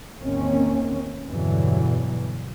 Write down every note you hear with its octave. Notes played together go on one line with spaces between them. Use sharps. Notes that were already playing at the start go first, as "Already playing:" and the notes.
A1 E2 D#3 A#3 C4 C#4
E2 G2 B2 D3 E3 F#3